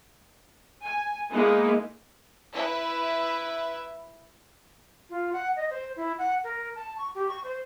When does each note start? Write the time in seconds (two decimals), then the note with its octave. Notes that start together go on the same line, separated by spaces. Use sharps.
0.82 G#5
1.31 G#3 A#3 B3 D#4 E4
2.53 E4 B4 E5
5.10 F4
5.33 F#5
5.56 D#5
5.70 C5
5.96 E4
6.19 F#5
6.44 A#4
6.76 A5
6.98 C#6
7.15 G4
7.28 C#6
7.44 C5